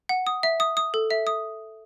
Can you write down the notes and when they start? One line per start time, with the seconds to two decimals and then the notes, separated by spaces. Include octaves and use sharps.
0.09 F#5
0.27 D#6
0.43 E5
0.60 D#6
0.77 D#6
0.94 A4
1.10 E5
1.27 D#6